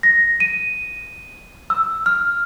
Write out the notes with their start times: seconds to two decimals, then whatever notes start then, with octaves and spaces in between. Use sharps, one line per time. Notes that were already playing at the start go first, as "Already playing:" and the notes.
0.03 A#6
0.40 D#7
1.70 E6
2.06 F6